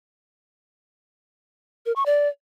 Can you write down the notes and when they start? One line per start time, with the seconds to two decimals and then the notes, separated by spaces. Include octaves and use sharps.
1.86 A#4
1.96 C#6
2.06 D5